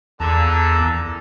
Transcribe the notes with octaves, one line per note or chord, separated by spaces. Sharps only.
E2 A#2 D3 A4 A5 A#5